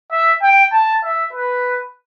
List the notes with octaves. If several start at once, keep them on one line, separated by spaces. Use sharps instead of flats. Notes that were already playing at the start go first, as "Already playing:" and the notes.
E5
G5
A5
E5
B4